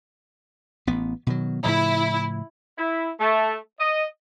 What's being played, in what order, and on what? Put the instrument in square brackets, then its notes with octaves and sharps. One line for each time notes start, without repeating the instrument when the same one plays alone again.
[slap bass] A1 B3
B2 D#3 F#3
[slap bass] A2 C#3 F3 [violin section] E4
[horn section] E4
A3
D#5